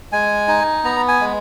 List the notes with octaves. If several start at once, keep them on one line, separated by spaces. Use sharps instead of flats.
G#3 G#5
D#4
B3 A#5
G#5
G#3